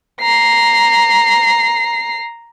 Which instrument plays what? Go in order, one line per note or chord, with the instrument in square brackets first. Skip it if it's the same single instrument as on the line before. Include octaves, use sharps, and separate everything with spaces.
[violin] A#5 C7